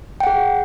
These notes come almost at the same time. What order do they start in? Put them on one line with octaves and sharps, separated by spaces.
G5 F#5 G#4